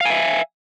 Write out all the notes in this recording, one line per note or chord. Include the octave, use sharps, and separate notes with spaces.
E5 F5 G#5